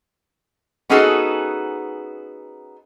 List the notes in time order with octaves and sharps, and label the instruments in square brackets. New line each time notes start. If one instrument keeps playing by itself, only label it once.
[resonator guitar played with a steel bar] B3 C#4 D#4 F#4 G#4 A4